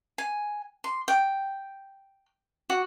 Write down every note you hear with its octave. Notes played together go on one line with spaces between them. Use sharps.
G#5
C6
G5
F#4